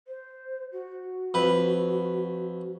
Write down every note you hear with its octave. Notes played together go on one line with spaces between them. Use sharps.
C5
F#4
F2 B4